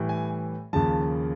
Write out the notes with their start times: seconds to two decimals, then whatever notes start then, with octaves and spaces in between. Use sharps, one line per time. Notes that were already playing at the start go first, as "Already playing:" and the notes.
Already playing: A2 E3 G3
0.09 G#5
0.73 D#2 C#3 F3 A5